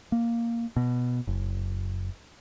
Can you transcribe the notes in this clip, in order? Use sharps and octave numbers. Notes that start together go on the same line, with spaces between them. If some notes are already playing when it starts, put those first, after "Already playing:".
A#3
B2
F#1